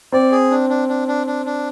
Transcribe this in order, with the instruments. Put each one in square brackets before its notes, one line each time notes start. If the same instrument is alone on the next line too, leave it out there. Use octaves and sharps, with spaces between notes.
[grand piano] C4 [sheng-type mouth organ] D5
[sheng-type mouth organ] G#4
D4
D4
D4
D4
D4
D4